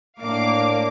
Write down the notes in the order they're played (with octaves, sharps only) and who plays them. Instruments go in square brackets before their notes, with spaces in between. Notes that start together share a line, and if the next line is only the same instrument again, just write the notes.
[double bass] A2 D4 [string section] A#3 F5 D6